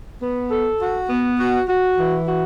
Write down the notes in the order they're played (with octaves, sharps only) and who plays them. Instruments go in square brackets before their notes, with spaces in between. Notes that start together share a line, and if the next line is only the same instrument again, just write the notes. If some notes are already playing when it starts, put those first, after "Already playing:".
[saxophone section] B3
A4
F#4
B3
F#4
F#4
E3
F#4